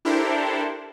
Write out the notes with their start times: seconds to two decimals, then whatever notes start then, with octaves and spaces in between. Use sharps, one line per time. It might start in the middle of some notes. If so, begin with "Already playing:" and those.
0.05 D4 E4 G4 A4 A#4 C5